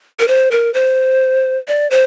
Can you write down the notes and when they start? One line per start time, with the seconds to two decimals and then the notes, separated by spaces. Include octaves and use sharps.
0.19 A#4
0.28 C5
0.51 A#4
0.74 C5
1.68 D5
1.91 C5